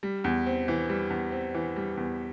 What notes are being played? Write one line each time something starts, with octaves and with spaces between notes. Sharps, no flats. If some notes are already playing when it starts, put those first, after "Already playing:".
G3
E2
C4
E3
G3
E2
C4
E3
G3
E2